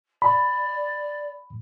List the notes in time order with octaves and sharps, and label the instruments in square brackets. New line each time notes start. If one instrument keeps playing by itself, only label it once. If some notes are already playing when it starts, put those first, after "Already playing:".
[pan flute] D5 [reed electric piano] B5